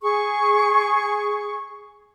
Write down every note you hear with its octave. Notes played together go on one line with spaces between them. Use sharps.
G#4 C#6